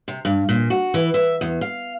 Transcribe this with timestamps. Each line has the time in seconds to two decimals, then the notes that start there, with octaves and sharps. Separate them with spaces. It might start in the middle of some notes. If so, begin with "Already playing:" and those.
0.08 C3
0.25 G2
0.49 A#2
0.70 F#4
0.94 E3
1.14 E5
1.41 E2
1.61 F5